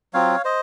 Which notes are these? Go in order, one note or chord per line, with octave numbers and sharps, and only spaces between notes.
F#3 C4 F4 C#5 F5
C5 D#5